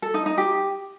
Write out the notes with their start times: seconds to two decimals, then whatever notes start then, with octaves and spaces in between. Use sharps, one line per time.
0.02 A4
0.14 D#4
0.26 D#4
0.38 G4